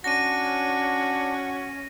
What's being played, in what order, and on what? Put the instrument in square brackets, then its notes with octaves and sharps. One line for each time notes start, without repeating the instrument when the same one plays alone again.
[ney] C#4 [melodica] D4 [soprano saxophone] F#4 [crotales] A#6 D#7